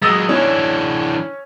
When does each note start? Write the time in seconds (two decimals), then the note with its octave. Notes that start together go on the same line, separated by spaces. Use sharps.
0.02 F#3 G#3 D#6 E6 A#6
0.29 E3 C#4 D4 C#5